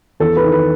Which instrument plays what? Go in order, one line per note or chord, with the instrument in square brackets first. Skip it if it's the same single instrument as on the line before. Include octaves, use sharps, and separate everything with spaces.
[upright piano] E2 A4
B4
D#3
B4